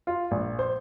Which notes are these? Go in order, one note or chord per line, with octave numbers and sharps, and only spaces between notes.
F4
A#1
C5